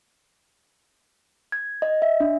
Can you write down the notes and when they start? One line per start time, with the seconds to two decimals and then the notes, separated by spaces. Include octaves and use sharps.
1.52 G#6
1.82 D#5
2.02 E5
2.20 D4